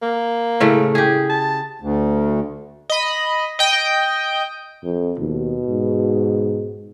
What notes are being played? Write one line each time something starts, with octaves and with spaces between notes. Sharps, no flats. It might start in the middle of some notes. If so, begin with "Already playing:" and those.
A#3
A2 C#3 A3
G4 G#4
A5
D2
D#5 B5
D#5 G5
F2
D#2 B2
G#2